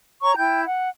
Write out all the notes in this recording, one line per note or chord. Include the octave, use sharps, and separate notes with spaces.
C#5 A#5 C#6
E4 G5 G6
F#5